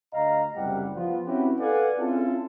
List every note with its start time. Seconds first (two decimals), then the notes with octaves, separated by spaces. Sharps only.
0.14 D2 D#5 F5 A#5
0.56 F#1 C2 G3 G4 F#5
0.97 F3 B3 F4
1.26 C4 C#4 E4 F#4 G4 B4
1.60 A4 B4 D5 F5 F#5 G#5
1.99 C4 C#4 E4 F4 G#4 A4